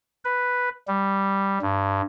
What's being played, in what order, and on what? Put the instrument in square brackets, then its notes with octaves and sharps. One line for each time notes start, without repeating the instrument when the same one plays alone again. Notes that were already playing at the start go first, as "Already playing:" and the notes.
[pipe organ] B4
G3
G2